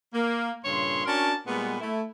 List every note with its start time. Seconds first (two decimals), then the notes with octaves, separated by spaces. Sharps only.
0.14 A#3
0.65 G2 A#2 C#3 C#5 C6
1.06 C#4 D4 F#4 A#4 C#5 A5
1.47 A#2 G3 G#3 B3
1.81 A3 E4